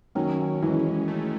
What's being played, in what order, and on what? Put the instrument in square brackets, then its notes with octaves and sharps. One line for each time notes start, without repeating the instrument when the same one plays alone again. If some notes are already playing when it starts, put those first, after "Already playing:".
[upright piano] D#3 F#3 [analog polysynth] C#4
[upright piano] E3 [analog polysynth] G#3
[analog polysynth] A3